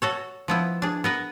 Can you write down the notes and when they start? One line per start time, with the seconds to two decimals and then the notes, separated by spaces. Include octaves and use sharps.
0.02 F#4 A4 C#5
0.48 F3 B3 E4
0.82 D4 G#4
1.04 B3 A#4 B4